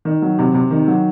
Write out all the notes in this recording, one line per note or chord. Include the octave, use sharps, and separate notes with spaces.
D#3
F#3
C3
C3
D#3
F#3